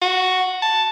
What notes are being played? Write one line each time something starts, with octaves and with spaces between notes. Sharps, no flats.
F#4
A5